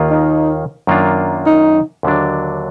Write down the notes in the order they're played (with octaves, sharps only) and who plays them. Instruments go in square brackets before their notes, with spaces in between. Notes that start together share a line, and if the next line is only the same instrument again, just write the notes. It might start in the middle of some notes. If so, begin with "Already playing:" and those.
Already playing: [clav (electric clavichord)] D#2 D#3 A#3 F4
[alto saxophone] D#4
[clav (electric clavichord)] F#2 D#3 A#3 D4 F4
[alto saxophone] D#4
[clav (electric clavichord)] D#2 D3 F#3 D4